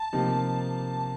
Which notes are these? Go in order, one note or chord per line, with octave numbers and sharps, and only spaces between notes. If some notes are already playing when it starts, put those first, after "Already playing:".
Already playing: A5
C3 F3 A#3 D#4 G4